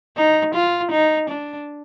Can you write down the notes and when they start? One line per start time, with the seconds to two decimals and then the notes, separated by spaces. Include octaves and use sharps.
0.17 D#4
0.55 F4
0.92 D#4
1.30 D4